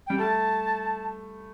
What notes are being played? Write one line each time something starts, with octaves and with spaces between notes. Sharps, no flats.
G3 G5
A3 A5